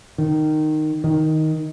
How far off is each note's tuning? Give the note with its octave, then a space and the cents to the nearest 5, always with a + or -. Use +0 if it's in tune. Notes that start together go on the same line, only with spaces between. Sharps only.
D#3 -10
D#3 +10